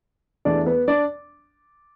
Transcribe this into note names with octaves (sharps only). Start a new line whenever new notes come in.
E2 E3 A3 D4 D5
B3 B4
D4 D5